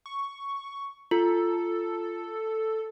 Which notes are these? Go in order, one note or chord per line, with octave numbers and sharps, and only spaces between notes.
C#6
F4 A4